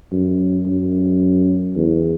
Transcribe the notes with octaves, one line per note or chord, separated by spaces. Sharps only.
F#2
F#2
E2